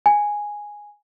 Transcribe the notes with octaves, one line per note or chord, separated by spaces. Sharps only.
G#5